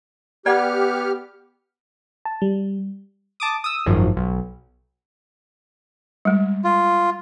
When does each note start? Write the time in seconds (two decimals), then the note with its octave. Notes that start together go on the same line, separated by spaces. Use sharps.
0.46 B3 G4 D5 F#5 F6
2.25 A5
2.42 G3
3.40 A5 D6 D#6
3.64 D#6 E6
3.86 G#1 F#2 D#3 F3
4.17 B1
6.25 G3 G#3
6.64 F4